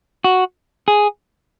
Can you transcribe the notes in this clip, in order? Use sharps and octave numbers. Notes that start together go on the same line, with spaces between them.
F#4
G#4